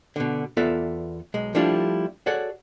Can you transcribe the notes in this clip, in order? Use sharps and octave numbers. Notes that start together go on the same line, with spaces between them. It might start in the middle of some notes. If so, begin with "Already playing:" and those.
B2 D3
E2 B3 F4 A4 D5 E5
B1 G#3
F3 G3 A3 D4 E4 F4
F#4 G#4 A4 C#5 D5 F#5